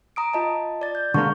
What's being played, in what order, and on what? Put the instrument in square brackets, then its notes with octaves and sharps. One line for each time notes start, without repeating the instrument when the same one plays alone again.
[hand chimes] A#5 D#6 D7
F4 D#5 A5
D5 A6
G6
[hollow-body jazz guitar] D3 G#3 A#3 [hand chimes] C#6